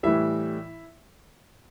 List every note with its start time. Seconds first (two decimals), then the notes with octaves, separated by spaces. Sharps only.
0.03 A2 E3 G3 E4 E5